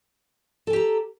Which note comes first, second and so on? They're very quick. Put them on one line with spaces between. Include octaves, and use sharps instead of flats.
A4 G#5 G4 A#5